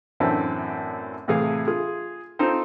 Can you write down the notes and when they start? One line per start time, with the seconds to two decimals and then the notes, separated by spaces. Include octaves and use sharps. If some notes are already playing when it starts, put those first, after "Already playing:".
0.20 F#2 A2 E3 A3 C4 D4
1.28 A2 C3 E3 G#4 A4 F5
1.67 F4 G#4
2.39 C4 D#4 F4 A4 C5